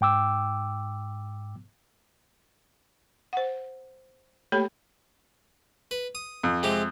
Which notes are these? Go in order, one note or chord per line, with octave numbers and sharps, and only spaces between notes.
G#2 G5 D6 E6
C5 F#5
A3 A#3 G4 A4 C#5 B5
B4
D#6
F2
C3 G#3 G4